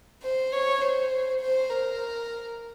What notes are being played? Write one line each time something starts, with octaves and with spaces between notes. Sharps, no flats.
C5
C#5
C5
C5
A#4